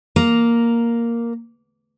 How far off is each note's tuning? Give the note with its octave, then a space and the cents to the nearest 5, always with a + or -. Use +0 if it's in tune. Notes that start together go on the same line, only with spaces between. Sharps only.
A#3 +0 A#5 +0